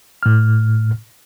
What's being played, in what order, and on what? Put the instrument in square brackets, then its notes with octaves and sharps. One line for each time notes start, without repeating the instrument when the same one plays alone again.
[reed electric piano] A2 F6